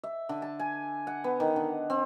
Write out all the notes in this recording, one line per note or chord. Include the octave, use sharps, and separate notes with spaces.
E5
D3
A5
G#5
F#5
B3
D#3
D3
C4